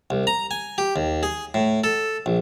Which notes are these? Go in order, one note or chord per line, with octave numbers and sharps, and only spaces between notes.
C2
A#5
G#5
G4
D#2
G#4
A2
A4
A#1